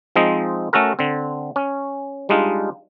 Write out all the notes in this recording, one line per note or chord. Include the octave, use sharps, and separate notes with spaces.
F3 G#3 C4 D#4 D#5
A3 C#4 F#4 A4 A#4
D3 C4
C#4
G3 G#3 D4 D#4 F4